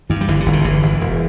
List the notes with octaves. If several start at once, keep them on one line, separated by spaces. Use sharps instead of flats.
G2 E3
G3
G1 E3
D3
G1
D3
G1 E3
G1
E1